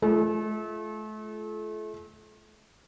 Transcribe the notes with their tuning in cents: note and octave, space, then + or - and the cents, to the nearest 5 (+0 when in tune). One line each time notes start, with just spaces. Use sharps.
A3 -35 F4 -25